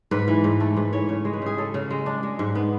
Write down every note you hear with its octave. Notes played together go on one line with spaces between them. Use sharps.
G#2 B4
E3
G#2
A3 A4
G#2 B4
E3 C#5
C#3 C#5
G#3
B4
C#3 G#4
C#4 A4
C#3
G#3
D4
G#3
G#2
B3